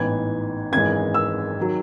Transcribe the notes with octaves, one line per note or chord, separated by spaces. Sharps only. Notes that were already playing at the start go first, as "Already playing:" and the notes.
Already playing: A1 G#2 E3 B3 G#6
G#1 F#2 E3 G#3 G#6
E6
D#3 F#3